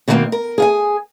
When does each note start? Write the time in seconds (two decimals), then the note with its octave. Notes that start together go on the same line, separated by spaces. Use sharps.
0.08 B2 D3 D#3 G3 A#3 C4
0.32 A#4
0.58 G#4 F5 G#5